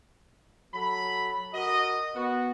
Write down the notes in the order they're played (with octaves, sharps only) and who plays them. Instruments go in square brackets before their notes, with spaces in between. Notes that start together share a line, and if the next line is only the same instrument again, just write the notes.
[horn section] F#3 A4 B5
F#4 A#4 D#5
B3 F#4